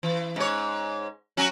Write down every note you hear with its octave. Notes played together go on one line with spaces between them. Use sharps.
E3
G#2 C#5
F#3 C#4 F#4